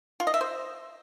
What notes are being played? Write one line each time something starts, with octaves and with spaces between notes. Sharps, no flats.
F4
D#5
E5
C5